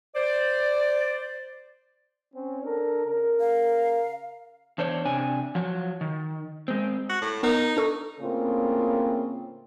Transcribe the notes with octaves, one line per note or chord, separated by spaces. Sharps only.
C5 D5
C4 C#4
D4 A4 A#4
C#3 A#4
F5
E2 D4 C5 C#5
C3 D4 G#5
F3 F#3
D#3
G#3 C4
F#4
A2
B3 D#4 A#4
D4 A4 C#6
A2 C#3 A#3 C4 F4